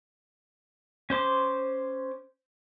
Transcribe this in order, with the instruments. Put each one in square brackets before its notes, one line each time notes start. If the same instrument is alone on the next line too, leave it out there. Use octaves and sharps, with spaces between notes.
[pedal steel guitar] C#4 C5 C6 D6